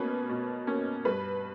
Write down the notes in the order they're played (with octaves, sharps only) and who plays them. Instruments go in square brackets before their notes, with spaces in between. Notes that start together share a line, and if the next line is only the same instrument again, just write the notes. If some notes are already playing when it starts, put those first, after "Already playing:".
Already playing: [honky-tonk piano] B2 A#3 C#4 B4
B2
A#3 C#4
G2 B4